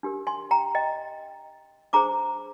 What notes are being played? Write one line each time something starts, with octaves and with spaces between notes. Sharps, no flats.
D4 G4 A#4
G#5 C6
G5 A#5
D#5 G5
D4 G#4 C5 A#5 D6